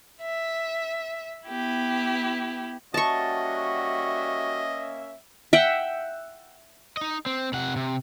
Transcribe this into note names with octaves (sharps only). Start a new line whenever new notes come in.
E5
B3 E4 G4
G3 A#3 C#4 F#4 D#5 E5 A5 C#6
E5 F#5 G5
D#4 D#5
C4
C3 F#5
C3